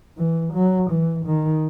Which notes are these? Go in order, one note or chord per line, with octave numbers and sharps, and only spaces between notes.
E3
F#3
E3
D#3